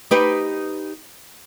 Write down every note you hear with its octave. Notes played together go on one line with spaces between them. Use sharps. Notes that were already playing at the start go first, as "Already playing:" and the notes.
D#4 G4 B4